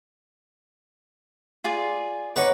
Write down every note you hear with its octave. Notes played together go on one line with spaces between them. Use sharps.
F4 G#4 D5
D#4 B4 C#5 F#5 D6